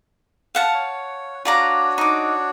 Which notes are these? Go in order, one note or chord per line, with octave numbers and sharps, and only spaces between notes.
F5 F#5 A5
C#5
D4 F4 F#4 C#5 D5 A#5
D#4 D6